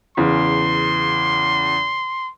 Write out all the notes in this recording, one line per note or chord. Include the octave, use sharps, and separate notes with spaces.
E2 C#3 C6